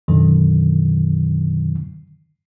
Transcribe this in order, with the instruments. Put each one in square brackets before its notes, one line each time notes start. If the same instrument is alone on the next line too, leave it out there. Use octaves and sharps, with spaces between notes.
[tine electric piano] F#2 B2 D3 D#3 F#3